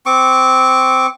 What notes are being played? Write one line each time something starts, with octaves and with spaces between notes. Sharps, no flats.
C4 C#6 D6